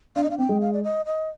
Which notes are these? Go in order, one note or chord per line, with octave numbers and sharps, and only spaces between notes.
D4 F5
D#5
D4
F5
C4 G5
G#3
F5
D5
D#5
D#5